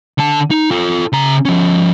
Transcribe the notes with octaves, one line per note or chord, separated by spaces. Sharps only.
D3 A5
D#4
F4 A4
C#3 A#5
F3 C#4